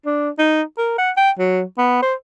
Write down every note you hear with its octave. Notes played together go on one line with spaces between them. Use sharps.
D4
D#4
A#4
F#5
G5
F#3
B3
C5